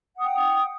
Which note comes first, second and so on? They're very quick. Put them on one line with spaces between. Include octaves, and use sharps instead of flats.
F#5 D#6 G5